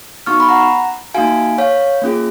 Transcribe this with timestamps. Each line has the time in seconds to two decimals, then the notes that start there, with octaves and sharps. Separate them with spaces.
0.26 B3 D#4 F#4 C#6 F6
0.40 B5
0.49 F#5 A#5
1.14 A#3 D#4 F#4 F5 G#5
1.58 C#5 F5
2.02 A#3 C#4 F4 G#4